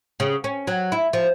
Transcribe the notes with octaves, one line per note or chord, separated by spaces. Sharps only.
C#3
C#4
F#3
E4
F3